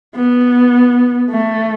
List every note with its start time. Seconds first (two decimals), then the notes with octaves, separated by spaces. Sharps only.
0.15 B3
1.31 A3